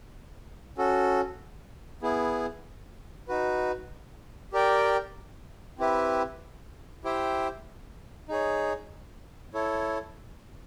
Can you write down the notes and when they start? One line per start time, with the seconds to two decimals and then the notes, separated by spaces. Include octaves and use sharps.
0.77 C#4 F#4 A4
2.02 B3 E4 G#4
3.28 D#4 F#4 B4
4.53 G4 A#4 D5 G5
5.79 C4 E4 G4 B4 E5
7.04 E4 G4 C5 E5 G5
8.29 D#4 G#4 C#5
9.54 E4 A4 C#5